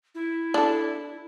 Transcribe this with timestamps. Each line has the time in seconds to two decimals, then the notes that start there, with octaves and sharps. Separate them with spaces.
0.15 E4
0.54 D4 A4